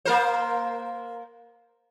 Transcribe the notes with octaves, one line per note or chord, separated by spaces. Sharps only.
A#3 A#4 C5